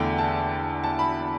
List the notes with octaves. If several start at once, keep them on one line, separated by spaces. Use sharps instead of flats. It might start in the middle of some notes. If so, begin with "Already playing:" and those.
Already playing: E2 D3 A3 G5
A5
A5
B5